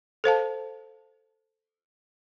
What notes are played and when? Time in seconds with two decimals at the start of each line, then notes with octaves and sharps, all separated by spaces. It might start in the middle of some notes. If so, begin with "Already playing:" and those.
0.24 A4 C5 F5 A5